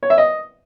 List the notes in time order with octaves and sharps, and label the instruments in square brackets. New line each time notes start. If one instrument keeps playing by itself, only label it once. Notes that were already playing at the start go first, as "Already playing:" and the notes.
[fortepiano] C#5
E5
D#5